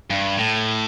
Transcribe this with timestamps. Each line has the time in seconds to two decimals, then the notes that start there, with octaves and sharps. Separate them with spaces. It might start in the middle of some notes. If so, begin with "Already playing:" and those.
0.10 G2
0.37 A2